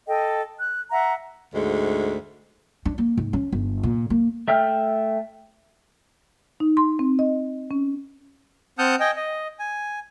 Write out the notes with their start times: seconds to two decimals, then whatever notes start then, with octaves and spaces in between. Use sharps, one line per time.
0.07 A4 D#5 G5
0.60 F#6
0.90 E5 F#5 A#5
1.54 D2 G#2 G#3
2.85 D4
2.98 A#3
3.17 G#2
3.33 C#4
3.52 G1
3.83 A#2
4.10 A#3
4.48 A3 E5 G5 F6
6.60 D#4
6.77 C6
6.99 C4
7.19 D#5
7.71 C#4
8.79 C4 F#5 A5 D#6 F6 G6
9.00 D#5 G5 G#5
9.16 D#5
9.59 G#5